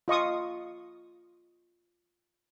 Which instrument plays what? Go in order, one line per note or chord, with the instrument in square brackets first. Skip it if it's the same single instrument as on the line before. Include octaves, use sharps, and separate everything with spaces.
[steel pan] F4 D#5 C#6 D#6